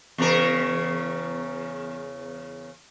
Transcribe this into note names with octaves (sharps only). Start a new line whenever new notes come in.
E2 C#3 A#4